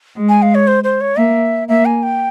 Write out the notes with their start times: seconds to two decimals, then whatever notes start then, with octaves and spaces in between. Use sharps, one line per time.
0.17 G#3
0.29 G#5
0.42 F5
0.55 C#5
0.67 C5
0.84 C5
1.01 C#5
1.17 A#3 E5
1.68 A#3 E5
1.85 G#5
2.03 G5